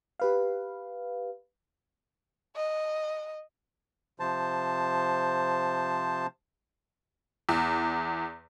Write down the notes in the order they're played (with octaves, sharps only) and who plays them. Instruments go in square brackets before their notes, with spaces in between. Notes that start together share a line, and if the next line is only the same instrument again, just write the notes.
[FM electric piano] G4 B4 F5
[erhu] D#5
[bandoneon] C3 F3 C5 A5
[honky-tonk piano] E2